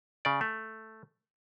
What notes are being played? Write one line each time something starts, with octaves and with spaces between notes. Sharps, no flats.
C#3 D5
A3